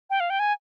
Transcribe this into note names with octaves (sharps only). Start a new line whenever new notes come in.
G5
F5
G5
G#5